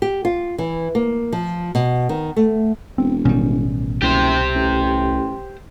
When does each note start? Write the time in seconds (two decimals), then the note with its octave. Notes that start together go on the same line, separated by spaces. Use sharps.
0.02 G4
0.25 F4
0.58 E3
0.95 A#3
1.32 F3
1.75 B2
2.09 D#3
2.36 A3
2.98 E1 C4
3.25 A1 B2 D#3 G3 C#4
4.02 F#1 C2 G4 C5
4.55 A1